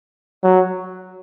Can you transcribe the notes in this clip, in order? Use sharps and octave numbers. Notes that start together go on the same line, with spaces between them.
F#3